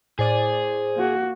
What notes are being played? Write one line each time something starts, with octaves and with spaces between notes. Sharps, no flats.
A2 G#4 C5 D5 D#7
A#3 F#4